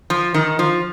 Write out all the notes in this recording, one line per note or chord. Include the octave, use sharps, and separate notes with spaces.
F3
D#3
F3